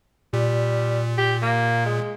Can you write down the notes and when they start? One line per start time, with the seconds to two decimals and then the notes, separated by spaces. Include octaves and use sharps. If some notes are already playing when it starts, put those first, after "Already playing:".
0.33 A#2 G3
1.18 G4
1.42 A#3
1.86 G#3